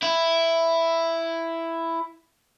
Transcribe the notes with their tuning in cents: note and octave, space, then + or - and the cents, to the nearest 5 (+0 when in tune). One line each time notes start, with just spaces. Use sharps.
E4 +5